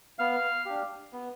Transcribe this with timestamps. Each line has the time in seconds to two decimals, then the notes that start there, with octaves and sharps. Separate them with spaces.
0.19 B3 F5 F6
0.65 D4 G4
1.13 B3